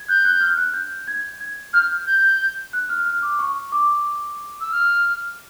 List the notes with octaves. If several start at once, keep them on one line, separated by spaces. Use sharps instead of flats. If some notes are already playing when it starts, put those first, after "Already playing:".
Already playing: G#6
F#6 G6
F#6
F6
F#6
G6
G#6
G#6
F6 G6
G6
F#6
F6
F6
D6
C#6
D6
E6
F6